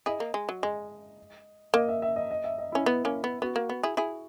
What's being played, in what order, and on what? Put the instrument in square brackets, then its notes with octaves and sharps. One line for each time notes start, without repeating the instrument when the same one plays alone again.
[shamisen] E4 G#4 [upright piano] D#5
[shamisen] A#3
G#3
F#3
[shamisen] G#3 [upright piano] D#5
[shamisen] A#3 [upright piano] D#5
[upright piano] E5
E5
D#5
D#5
E5
D#5
[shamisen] C#4 [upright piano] E4
[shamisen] B3
A#3 C#4
B3
[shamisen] B3 [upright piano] F#4
[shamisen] A#3
B3
E4 G#4
E4 G#4